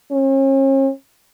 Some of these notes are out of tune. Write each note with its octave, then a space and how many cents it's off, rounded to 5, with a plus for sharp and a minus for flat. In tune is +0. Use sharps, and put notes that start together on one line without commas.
C#4 -40